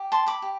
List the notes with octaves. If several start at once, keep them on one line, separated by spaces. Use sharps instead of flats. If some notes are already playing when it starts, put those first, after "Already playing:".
Already playing: G4
A5 C6
B5 D6
G4